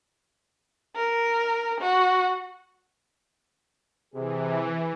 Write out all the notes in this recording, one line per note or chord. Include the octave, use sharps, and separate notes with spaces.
A#4
F#4
C3 E3 G#4